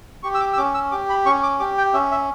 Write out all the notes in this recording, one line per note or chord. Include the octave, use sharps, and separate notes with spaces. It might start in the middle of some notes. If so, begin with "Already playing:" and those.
G4 C#6
E6
D6
E6
C#4 D6
E6
G4 D6
B5
C#4 C#6
D6
G4 D6
G5
C#4 E5
E5